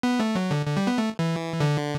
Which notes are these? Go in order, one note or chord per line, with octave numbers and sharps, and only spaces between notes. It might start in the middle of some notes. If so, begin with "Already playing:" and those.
B3
A3
F#3
D3
D3
G3
B3
A3
E3
D3